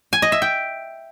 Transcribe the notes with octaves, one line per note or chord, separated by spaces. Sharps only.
G#5
D#5
E5
G5